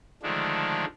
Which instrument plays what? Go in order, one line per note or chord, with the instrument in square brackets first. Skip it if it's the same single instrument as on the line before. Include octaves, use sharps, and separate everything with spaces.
[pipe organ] D3 D#3 F3 G#3 A3 D4